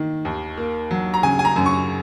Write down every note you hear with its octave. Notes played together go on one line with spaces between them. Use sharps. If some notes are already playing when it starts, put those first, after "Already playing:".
Already playing: D#3 A#3
D#2
A#3
F#3
A#5
C#3 G#5
G#5
A#5
F#2
C#6